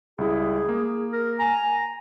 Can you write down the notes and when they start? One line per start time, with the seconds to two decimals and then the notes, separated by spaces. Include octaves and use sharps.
0.18 C#2 G3 E4 G#4
0.69 A#3
1.12 A#4
1.39 G#5 A#5